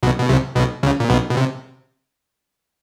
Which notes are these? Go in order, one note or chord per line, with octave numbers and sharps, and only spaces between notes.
B1 B2
B2
C2 C3
B1 B2
C#2 C#3
A#2
B1 B2
B2
C3